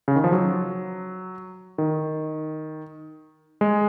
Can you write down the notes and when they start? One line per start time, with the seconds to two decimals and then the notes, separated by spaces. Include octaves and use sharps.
0.08 C#3
0.16 D#3
0.24 F3
0.32 F#3
1.78 D#3
3.61 G#3